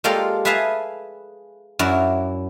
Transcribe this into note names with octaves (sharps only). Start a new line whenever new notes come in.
G#3 A#3 F4 G4 A4 D5
G#4 B4 E5 F5 G#5 A5
F#2 F#3 E4 D5